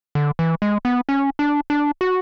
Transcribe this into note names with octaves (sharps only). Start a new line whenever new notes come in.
D3
E3
G#3
B3
C#4
D4
D4
F#4